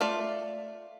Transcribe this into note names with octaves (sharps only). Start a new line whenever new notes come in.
A3 F4 D5